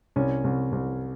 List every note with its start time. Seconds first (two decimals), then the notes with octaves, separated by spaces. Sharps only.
0.16 C2 C#4
0.44 C2
0.72 C2